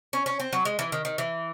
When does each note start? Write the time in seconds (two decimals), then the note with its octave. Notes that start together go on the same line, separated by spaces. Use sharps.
0.13 C#4
0.26 C#4
0.40 C4
0.53 F#3
0.65 G#3
0.79 E3
0.92 D#3
1.05 D#3
1.18 E3